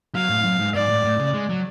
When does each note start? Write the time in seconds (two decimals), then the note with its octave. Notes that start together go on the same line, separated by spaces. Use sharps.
0.15 F#3 F5
0.29 A2
0.44 F#2
0.59 G#2
0.74 G#2 D5
0.89 A2
1.04 A2
1.20 C#3
1.34 G#3
1.49 F#3